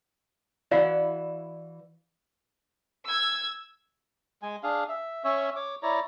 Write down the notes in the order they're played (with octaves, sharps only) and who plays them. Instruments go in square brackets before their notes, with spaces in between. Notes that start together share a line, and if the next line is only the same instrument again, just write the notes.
[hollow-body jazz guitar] E3 E4 F#4 [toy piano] D5 F5
[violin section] E6 G#6
[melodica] G#3 G#5
D4 G#4 F5
E5
C#4 C#5 E5
C#5 D6
E4 C#5 D5 A#5